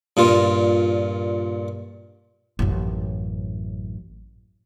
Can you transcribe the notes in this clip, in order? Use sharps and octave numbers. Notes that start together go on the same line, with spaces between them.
G2 A#2 F4
A1 F#2